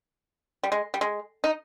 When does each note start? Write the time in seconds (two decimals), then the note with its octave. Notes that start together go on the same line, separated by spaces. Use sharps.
0.63 G3
0.72 G#3
0.94 G3
1.01 G#3
1.44 D#4